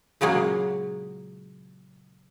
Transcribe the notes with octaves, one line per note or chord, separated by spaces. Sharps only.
A#2 C#3 F#3 G#3 A#3